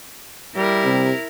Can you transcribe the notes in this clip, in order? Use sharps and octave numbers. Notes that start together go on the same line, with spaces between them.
G3 E4 A#4
C3